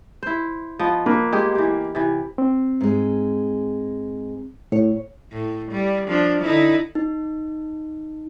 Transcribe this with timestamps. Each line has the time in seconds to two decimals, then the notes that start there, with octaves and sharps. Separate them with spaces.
0.23 E4 C5
0.79 F3 B3 D#5
1.06 A#3 B4
1.32 G#3 G4 G#4
1.55 E3 G4
1.95 C3 E3
2.38 C4
2.81 G#2 G#3
4.72 A2 C#5
5.32 A2
5.71 G3
6.08 F3 D4
6.41 D3 D#4 E4
6.95 D#4